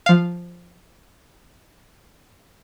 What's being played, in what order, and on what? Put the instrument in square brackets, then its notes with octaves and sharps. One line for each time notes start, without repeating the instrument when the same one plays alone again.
[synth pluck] F3 F5